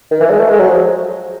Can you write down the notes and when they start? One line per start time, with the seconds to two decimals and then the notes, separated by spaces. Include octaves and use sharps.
0.11 D#3
0.20 E3
0.30 G#3
0.39 A3
0.49 G#3
0.59 F#3
0.69 F3